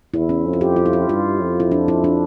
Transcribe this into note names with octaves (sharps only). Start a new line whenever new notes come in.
E2 E4
C#4
F2
F4
G4
F4
E4
F4
G2 F4
F2
E4
D4
E4
D4